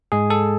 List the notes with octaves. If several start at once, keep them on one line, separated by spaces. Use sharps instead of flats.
G#2 G#3 G#4
A4